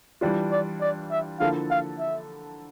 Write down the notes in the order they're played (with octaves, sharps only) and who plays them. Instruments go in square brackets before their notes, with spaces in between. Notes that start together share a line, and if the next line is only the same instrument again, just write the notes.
[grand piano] E3 G3 D4 F4
[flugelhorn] D5
D5
E5
[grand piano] D3 F3 A#3 E4 A4 [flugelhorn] F5
[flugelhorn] F5
E5